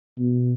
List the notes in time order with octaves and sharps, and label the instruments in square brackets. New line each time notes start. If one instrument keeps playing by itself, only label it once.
[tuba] B2